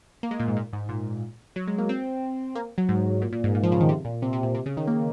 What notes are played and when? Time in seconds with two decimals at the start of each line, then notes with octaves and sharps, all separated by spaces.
0.23 A#3
0.31 G#3
0.40 A#2
0.48 G#2
0.57 A#2
0.73 G#2
0.89 A#2
1.56 F#3
1.68 G#3
1.78 A#3
1.89 C4
2.55 A#3
2.78 F#3
2.89 G#2
3.22 A#2
3.32 A#2
3.44 G#2
3.55 A#2
3.63 F3
3.72 C#3
3.80 D#3
3.89 C3
4.05 A#2
4.22 C3
4.33 C3
4.43 A#2
4.55 C3
4.66 C#3
4.77 D#3
4.88 A#3